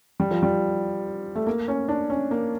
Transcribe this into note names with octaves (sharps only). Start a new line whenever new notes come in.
G3
F3
G3
A3
A#3
C#4
D4
C#4
A#3